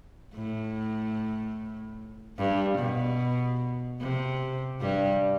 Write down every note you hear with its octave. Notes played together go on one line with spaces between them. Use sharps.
A2
G2
B2
C3
G2 G3